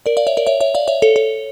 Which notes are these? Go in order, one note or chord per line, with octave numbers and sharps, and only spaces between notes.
A#4 D5
D5 F5
C#5 E5
A#4 D5
C#5 E5
C#5 E5
D5 F5
C#5 E5
A4 C#5
A4 C#5